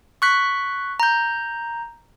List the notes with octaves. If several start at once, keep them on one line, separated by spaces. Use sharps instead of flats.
C#6 F#6 B6
A#5 G6